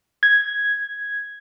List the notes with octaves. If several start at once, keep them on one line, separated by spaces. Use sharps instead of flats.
G#6